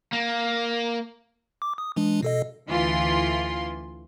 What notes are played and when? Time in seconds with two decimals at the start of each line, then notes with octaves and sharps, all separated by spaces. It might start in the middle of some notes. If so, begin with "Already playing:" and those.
0.13 A#3
1.62 D6
1.78 D#6
1.96 E3 G#3 D4
2.23 B2 A4 D#5
2.68 D2 E3 F4 C6